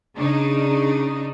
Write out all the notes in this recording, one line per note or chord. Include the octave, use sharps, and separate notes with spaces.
C#3 D4 D#4